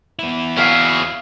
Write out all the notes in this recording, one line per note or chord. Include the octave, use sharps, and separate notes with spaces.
B3 E4
F#3 G#4 E5 F5 D7